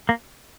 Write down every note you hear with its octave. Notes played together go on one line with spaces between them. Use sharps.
A#3